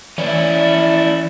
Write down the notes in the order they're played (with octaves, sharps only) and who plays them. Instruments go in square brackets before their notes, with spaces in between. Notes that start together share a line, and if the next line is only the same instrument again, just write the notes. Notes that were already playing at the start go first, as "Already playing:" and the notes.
[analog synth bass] E3 [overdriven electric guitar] C#4 E4 [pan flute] D5